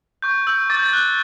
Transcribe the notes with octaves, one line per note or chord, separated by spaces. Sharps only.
C#6 G6
E6 G6
D6 A6
G6
A6
F#6